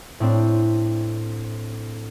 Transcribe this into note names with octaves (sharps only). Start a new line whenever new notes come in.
A2 C4 D4